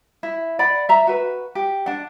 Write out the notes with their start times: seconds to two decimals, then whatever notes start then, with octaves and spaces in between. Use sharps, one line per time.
0.23 E4
0.59 D5 F#5 B5
0.89 E5 A#5
1.07 F#4 B4
1.55 G4
1.86 D4 F#5